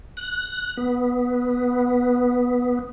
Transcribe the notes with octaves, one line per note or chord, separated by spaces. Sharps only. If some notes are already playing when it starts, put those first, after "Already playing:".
F#6
B3